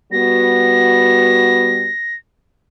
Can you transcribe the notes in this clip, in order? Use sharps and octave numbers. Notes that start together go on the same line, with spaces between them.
G3 B3 F#4 A#6